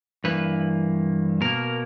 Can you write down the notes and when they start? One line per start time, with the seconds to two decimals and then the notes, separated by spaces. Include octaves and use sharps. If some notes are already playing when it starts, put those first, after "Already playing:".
0.24 G2 E3 A#3 B4
1.41 B2 A#3 A#4